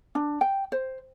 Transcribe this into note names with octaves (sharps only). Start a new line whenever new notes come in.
D4
G5
C5